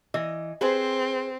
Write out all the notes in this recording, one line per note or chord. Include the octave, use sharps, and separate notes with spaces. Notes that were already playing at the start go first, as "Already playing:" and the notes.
E3 D#5
C4 G#4 B4 C5